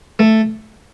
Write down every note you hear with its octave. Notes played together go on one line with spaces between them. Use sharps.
A3